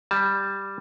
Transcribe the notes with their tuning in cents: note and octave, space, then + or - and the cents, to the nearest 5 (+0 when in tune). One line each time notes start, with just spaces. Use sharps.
G3 +0 A5 -20